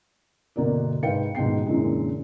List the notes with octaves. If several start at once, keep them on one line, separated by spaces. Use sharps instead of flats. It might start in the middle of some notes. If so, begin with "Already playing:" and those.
G1 B2 A#3 B3 D5
C2 G#2 B4 F5 G5 C#7
D#1 G#2 B2 B3 G5 C7
F#2 A#2 D3 E3 G#3